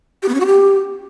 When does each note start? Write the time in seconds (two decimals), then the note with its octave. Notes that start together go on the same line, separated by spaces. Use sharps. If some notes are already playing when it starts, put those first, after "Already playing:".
0.23 G4
0.28 B3
0.34 C#4
0.40 F#4
0.46 G4